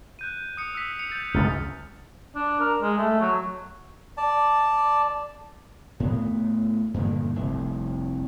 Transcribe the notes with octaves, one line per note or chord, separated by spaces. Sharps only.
F#6 G6 D#7
D#6 C#7
E6 B6
C#7 F7
G6 A6
C#2 F#2 F6 A6
D4
A#4
G#3
A3
F#3
D5 A5
A2 B3
G2 A#2 D3 D#3
F1 C2